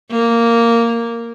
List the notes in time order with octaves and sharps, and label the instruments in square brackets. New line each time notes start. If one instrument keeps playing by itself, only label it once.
[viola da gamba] A#3